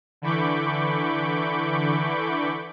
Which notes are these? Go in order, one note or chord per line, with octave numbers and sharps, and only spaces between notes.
D3 E3 B5 C#6 D6 G6